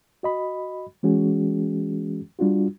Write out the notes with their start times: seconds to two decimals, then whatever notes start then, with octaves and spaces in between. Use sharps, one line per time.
0.23 F#4 D#5 B5
1.03 E3 G#3 C#4 F#4 G#4
2.39 G3 D4 F4 F#4